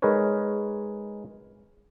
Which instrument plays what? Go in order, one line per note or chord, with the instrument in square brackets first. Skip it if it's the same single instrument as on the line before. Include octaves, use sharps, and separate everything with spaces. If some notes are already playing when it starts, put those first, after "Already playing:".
[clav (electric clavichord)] G#3 D#4 G#4 A#4 B4 C#5